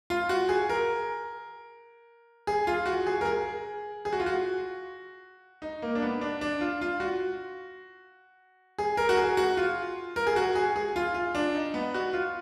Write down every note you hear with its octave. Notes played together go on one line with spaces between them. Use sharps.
F4
F#4
G#4
A#4
G#4
F4
F#4
G#4
A#4
G#4
G#4
F#4
F4
F#4
D#4
A#3
D4
B3
D4
D4
F4
F4
F#4
G#4
A#4
F#4
G#4
F#4
F4
A#4
G#4
F#4
G#4
G#4
F4
F4
D4
D#4
B3
F#4
F4